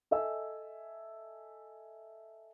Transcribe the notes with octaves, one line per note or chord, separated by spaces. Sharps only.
A4 D#5 E5 G#5 E6